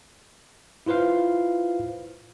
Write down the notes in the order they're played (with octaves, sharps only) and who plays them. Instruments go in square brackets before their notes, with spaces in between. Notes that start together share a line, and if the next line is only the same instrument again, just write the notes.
[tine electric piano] E4 F4 B4 C5 F5